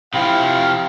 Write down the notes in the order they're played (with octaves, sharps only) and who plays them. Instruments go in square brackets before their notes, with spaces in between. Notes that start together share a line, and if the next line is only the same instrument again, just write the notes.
[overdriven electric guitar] C3 F3 [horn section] E4 F5